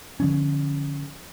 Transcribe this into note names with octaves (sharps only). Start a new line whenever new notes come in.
D3 F3 C#4